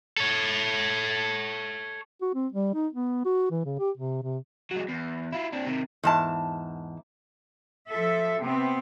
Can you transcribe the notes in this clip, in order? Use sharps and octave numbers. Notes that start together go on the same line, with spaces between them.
A4 C#5
F#4
C4
G3
D#4
B3
F#4
E3
C#3
G4
C3
C3
F#3 G#3
E2
E4 F4
C4 D4
C3 D#3
E2 G#2 A5
F3 A4 E5
C3 B3 C4